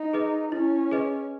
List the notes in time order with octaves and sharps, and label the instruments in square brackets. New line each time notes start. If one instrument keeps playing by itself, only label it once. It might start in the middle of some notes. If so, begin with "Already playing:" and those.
Already playing: [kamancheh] D#4
[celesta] G#4 B4 D#5
[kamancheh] C#4 [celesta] E4
[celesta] G#4 B4 D#5